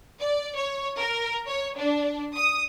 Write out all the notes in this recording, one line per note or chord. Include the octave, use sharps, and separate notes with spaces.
D5
C#5
A#4
C#5
D4
D#6